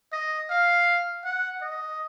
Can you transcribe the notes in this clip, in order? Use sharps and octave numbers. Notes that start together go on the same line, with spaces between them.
D#5
F5
F#5
D#5